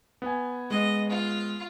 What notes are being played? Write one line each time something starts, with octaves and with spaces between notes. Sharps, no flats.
B3 G#5
G#3 B3 D#5
F4